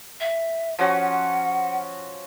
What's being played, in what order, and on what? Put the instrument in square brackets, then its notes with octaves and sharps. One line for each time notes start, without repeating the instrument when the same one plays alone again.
[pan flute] E5
[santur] F3 C#4 F#4 [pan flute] F#5